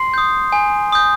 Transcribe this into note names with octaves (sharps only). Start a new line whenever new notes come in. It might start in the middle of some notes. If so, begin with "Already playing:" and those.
Already playing: C6 C7
D#6 G6
G#5
D#6 G6